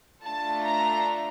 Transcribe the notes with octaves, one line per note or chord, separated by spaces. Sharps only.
A3 D4 F4 A4 A5
A#5